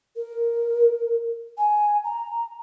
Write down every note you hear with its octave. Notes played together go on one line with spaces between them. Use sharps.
A#4
G#5
A#5